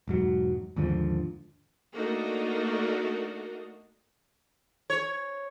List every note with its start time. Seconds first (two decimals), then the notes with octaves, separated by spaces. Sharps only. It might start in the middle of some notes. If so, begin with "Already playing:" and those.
0.08 E1 G#2 F#3
0.76 D#2 G#2 D3 F3
1.94 A3 A#3 D4 D#4 F#4 A#4
4.90 C#5